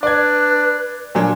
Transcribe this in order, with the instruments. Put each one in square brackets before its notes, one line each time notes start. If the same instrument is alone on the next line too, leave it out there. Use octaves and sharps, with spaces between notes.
[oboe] D4 [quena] B4 [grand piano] D5 G#6
[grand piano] A#2 F#3 D4 [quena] G#5